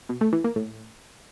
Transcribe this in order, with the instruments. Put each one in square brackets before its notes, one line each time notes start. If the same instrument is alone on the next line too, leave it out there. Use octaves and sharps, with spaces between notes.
[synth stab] B2
A3
E3
A#3
A2